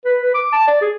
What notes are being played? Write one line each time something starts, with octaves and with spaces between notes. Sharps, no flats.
B4
B4
D6
A5
D5
G#4